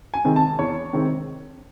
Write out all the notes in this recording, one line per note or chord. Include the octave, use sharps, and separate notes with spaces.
G#5
C3 D#3 G#3 C4
A5
E2 C#5
C3 D#3 G#3 C4